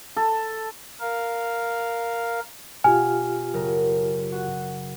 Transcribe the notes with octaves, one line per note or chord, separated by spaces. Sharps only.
A4
A#4 F5
B2 F4 G4 G#5 F6
F#1 C#3 A#4
F#4